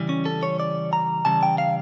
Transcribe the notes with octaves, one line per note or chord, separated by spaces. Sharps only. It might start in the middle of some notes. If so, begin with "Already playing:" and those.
Already playing: C#3 E3 G3
C#4
A4
C#5
D5
A#5
C#3 E3 G3 A5
G5
F5